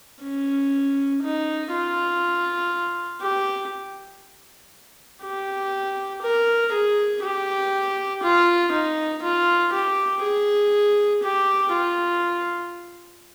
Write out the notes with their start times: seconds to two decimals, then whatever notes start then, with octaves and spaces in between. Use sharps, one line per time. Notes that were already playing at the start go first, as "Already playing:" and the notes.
0.23 C#4
1.23 D#4
1.72 F4
3.22 G4
5.23 G4
6.22 A#4
6.72 G#4
7.23 G4
8.23 F4
8.72 D#4
9.23 F4
9.73 G4
10.23 G#4
11.23 G4
11.72 F4